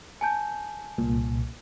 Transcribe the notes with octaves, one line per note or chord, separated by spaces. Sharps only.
G#5 A5 G6
C2 A#2